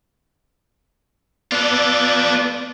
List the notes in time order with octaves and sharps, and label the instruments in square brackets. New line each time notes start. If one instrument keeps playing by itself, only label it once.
[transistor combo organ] B3 D5 [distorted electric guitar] F4 A4